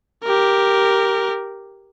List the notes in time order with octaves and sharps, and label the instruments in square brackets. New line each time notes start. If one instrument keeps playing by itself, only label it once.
[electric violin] G4 A#4